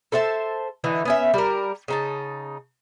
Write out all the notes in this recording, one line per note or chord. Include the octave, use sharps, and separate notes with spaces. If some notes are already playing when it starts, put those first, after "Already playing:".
A4 C5 E5 A5
D3 E3 D#4
B3 C#4 E5
G3 A#4
C#3 D#4 A5